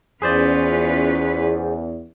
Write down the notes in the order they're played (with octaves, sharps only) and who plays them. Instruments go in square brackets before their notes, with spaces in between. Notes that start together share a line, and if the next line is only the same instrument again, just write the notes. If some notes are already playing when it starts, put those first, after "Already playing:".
[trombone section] E2 [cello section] C#4 F4 B4 [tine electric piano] G#4 C5 D5